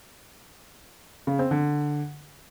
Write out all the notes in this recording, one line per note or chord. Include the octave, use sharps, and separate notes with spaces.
C#3
C4
D3